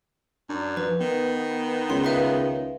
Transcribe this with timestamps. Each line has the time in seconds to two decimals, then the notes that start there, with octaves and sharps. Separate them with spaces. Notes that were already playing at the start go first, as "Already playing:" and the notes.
0.49 F#2 D4
0.77 F3 B4
1.00 D#3 B3
1.90 C#2 C6
2.05 B4 E5 F5